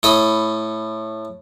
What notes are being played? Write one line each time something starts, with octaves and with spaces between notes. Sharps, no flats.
A2 D#5 B5